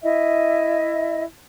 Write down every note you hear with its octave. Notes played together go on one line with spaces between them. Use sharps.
E4 D#5 E5